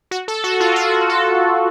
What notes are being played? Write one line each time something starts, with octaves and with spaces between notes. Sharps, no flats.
F#4
A4
F#4
F4
F#4
A4